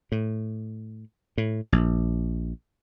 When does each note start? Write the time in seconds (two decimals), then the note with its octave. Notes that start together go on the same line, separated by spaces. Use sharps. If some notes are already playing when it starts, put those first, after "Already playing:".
0.12 A2
1.38 A2
1.72 A#1